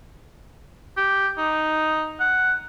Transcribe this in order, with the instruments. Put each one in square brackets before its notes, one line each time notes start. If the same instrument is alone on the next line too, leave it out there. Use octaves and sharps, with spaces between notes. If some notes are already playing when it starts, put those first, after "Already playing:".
[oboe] G4
D#4
F#5